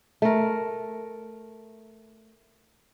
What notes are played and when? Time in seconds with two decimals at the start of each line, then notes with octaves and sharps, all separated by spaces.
0.22 A3 A#4